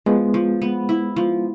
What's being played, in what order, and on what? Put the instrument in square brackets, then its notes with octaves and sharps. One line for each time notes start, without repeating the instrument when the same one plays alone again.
[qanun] F3 [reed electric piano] G#3 B3
[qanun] F3
B3
E4
F3